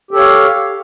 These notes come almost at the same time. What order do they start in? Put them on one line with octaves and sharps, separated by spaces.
G4 A4 C#5 F5